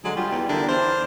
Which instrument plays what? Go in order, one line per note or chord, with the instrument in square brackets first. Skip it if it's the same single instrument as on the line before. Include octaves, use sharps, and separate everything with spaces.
[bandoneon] D3 G#3 G#4 [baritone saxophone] F#3
[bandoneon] G3 G4 [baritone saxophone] F4
[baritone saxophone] E2
[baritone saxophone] D3 [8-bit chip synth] D4 [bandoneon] E4 G4 A#4
[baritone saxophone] E2 [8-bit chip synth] C5 [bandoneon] D5 A5 F6